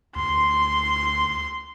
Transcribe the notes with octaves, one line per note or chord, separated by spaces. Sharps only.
D2 C6